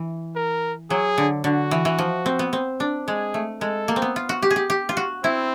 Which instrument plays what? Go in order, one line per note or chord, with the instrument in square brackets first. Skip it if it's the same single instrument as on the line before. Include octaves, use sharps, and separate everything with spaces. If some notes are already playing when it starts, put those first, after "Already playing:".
Already playing: [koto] E3
[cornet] A#4
[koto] F#3 [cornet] G#4
[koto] D3
[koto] D3 [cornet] F#4
[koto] E3
E3
F3
C4
B3
C4
D4
[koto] G#3 [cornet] G#4
[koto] A3
[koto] G#3 [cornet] A4
[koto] A#3
C4
B3
F4
F#4
G4
G#4
G4
G4
F4
F#4
[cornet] C4 [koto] E4